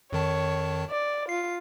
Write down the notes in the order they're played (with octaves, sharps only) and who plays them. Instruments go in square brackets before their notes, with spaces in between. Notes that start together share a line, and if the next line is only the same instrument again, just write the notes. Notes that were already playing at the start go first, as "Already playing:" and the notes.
[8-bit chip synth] F2 D#3 A5 [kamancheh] C#5
[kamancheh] D5
[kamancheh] F4 [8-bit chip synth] C7